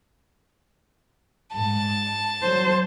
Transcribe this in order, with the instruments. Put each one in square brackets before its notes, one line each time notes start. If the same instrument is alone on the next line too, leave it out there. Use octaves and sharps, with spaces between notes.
[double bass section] G#2 G#3 [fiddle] A5
[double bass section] F#3 [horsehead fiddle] C5